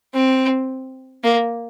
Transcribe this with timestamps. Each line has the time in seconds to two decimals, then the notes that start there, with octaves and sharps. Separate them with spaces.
0.14 C4
1.24 A#3